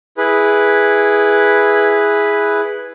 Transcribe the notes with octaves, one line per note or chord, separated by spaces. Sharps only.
E4 G#4 B4